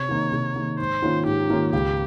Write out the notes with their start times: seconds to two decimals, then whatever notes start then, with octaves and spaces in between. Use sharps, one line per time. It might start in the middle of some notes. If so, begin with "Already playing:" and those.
Already playing: C3 C#5
0.09 D#3 A#3 D#4
0.32 C3
0.56 D#3 A#3 D#4
0.79 G#2 C5
1.02 D#3 A#3 C#4 F4
1.26 G#2 G4
1.50 D#3 A#3 C#4 F4
1.73 C#2 G4